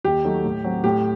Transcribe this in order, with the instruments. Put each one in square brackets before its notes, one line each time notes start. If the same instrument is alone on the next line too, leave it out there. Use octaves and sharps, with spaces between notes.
[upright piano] D#2 [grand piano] G4
[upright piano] D#3 F#3 A3 D#4
A2
F#3 C4
[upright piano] A2 [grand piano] G4